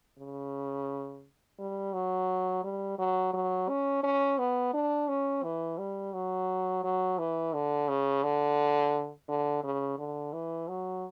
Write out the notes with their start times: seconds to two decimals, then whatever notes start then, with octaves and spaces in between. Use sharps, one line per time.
0.18 C#3
1.59 G3
1.93 F#3
2.64 G3
2.98 F#3
3.34 F#3
3.69 C#4
4.03 C#4
4.39 B3
4.74 D4
5.08 C#4
5.43 E3
5.78 G3
6.13 F#3
6.84 F#3
7.19 E3
7.53 D3
7.88 C#3
8.23 D3
9.29 D3
9.64 C#3
9.98 D3
10.33 E3
10.68 F#3